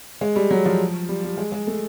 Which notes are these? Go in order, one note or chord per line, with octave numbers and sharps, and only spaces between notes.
G#3
G3
F#3
F3
G3
G3
G#3
G#3
A3